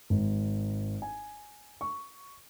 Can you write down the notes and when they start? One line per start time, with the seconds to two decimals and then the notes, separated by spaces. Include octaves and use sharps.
0.10 G#1
1.02 G#5
1.81 C#6